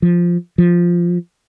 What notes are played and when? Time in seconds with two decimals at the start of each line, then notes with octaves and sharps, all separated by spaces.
0.02 F3
0.58 F3